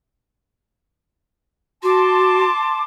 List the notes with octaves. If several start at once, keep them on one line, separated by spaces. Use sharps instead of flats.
F#4 A5 C6 D6